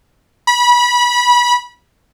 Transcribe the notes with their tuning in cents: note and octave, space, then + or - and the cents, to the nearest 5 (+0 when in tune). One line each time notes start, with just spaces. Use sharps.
B5 -25